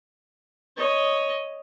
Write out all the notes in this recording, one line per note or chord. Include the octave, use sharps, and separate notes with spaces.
C#5 D#5